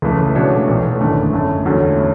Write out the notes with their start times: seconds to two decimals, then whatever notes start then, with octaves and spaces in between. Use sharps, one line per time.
0.02 C#2 C#3 E3 A3 E4
0.35 B2 A3 D4 F#4 C#5
0.67 B1 A2 E3
1.01 G#1 F#2 D3 A3 D4
1.33 F#2 D3 A3
1.65 E2 D3 F#3 A3 C#4